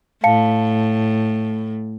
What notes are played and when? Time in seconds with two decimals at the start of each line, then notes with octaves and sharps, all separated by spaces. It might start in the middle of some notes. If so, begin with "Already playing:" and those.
0.24 A2 F5 A5 C#7